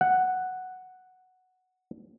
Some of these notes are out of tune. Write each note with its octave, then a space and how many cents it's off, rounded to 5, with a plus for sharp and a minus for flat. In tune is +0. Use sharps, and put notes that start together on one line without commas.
F#5 +0